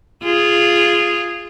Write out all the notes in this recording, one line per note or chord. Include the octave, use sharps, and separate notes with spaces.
F4 G#4